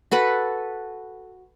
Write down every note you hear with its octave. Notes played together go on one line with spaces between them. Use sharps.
F#4 A4 B4 F#5